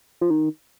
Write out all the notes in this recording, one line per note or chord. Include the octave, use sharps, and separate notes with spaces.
F3
D#3